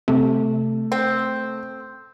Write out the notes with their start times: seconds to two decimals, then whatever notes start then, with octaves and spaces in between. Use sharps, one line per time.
0.08 C3 A3
0.92 C4